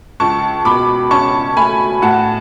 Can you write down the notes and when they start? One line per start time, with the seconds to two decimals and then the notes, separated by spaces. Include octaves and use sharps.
0.20 C#2 A5 C#6
0.65 B2 B5 D6
1.11 C#4 A5 C#6
1.56 A3 G#5 B5
2.02 A2 F#5 A5